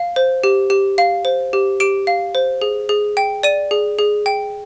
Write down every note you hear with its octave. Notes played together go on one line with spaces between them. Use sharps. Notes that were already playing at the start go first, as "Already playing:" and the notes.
Already playing: F5
C5
G4
G4
F5
C5
G4
G4 D7
F5
C5
G#4
G#4
G5
D5 D#7
G#4
G#4
G5